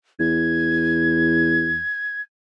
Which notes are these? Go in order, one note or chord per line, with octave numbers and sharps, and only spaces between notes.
E2 G#6